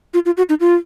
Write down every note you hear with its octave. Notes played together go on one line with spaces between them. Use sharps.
F4
F4
F#4
D#4
F4